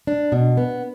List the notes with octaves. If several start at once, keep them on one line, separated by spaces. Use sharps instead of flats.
D4
B2
B3